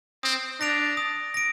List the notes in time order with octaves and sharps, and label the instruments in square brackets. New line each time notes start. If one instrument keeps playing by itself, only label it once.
[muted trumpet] C4 [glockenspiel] D#6
[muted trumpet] D4 [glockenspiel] A#6 D7 F7
[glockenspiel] D#6
A#6 D7